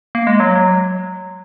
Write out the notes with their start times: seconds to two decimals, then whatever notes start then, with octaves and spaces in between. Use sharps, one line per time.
0.15 A#3
0.27 G#3
0.40 F#3
0.56 F#3